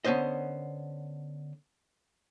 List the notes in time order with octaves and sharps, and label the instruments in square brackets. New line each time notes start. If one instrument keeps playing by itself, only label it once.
[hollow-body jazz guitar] D3 B3 C#4 C5 D#5